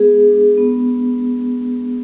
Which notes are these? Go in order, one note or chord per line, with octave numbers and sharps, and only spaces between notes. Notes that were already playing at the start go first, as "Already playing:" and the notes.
Already playing: G#3 B3 G#4
D4
B3